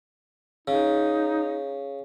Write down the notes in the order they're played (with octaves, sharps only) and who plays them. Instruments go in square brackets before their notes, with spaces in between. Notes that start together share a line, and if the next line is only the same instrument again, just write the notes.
[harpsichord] C#3 [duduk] D#4